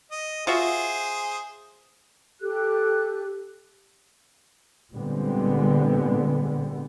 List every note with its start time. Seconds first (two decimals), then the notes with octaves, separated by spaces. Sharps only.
0.11 D#5
0.47 F4 F#4 G#4 C5 E5
2.42 G4 A4 F#6
4.92 A#2 D3 G3 G#3 B3 C4